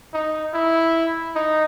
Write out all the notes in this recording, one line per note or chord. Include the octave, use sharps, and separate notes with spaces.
D#4
E4
D#4